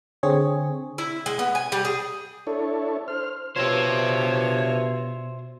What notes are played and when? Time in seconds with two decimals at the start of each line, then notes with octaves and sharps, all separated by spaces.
0.23 D3 C4 G#4 C#5
0.98 E4
1.26 G#3
1.39 B3
1.55 G#5
1.72 G3
1.85 G#4
2.47 D4 E4 A4 C#5
3.08 C5 F6
3.57 G2 B2 F3 C5 C#5 E5